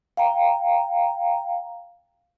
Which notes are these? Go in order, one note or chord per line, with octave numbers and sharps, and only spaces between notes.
F5 G5 A#5